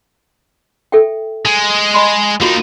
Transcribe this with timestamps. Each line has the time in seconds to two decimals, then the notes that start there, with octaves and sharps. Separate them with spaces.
0.92 A4 E5 G5
1.45 G#3
1.94 D#5 B5 C6
2.41 A#3 D#4 F4 F#4